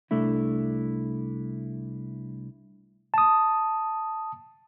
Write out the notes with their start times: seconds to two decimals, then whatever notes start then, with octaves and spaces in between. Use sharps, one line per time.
0.11 C2 A3 D4 E4
3.14 A5 D#6